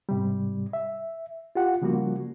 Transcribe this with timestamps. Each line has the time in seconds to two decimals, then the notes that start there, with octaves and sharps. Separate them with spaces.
0.09 G#2 C3 G3
0.73 E5
1.55 F4 G4 F#5
1.82 C#3 F3 G3 A#3 F#4